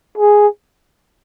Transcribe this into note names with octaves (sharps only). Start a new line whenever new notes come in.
G#4